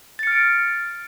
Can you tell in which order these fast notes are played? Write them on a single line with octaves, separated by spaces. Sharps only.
A6 C#7 F6 D7